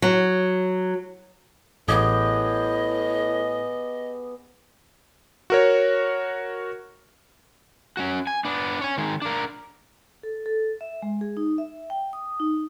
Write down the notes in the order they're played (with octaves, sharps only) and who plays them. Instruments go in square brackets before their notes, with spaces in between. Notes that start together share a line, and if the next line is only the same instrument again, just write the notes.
[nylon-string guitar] F#3
[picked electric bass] A1 [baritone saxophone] A2 [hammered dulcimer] B3 G4 G#4 [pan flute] D#5
[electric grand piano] F#4 A#4 C#5
[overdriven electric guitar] C#4 F#4
G#5
B3 D4
C#5 G#5
D#3 G#3
D4 A#4
[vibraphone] A4
A4
E5
G#3
G#4
D#4
E5
G5
D#6
D#4